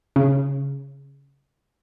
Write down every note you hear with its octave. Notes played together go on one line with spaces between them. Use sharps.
C#3